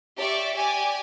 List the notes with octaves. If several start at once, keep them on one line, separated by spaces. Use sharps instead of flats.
G4 D5 E5 C#6
G4 D5 G#5